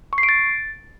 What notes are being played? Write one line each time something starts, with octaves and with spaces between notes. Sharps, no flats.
C#6
C7
D7
A6